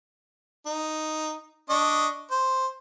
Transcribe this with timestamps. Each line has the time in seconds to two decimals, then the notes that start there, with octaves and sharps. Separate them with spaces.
0.66 D#4
1.70 D4 D#5 C#6
2.31 C5